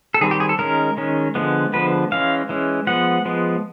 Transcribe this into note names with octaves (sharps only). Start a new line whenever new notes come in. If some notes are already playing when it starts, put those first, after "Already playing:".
A4
D#3 G3 C4 G#4
G4
G#4
A4
D#3 G#3 C#4 A#4
D#3 G#3 C#4
D3 F3 G#3 B3
D3 F3 G#3 B3 B4
E3 G#3 C#4 F5
E3 G#3 C#4
F3 G#3 B3 F#5
F3 G#3 B3